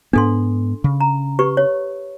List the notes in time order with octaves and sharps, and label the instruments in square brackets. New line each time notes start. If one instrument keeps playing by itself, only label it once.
[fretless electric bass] G#2 B3 [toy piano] D4 A4 C6
[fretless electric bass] C#3
[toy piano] A#5
G4 B4 C#6
C#5